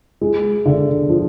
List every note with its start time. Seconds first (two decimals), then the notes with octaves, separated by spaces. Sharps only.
0.21 G#3
0.66 D3
1.09 F3